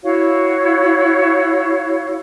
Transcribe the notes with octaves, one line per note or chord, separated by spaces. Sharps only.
E4 F#4 C#5 F5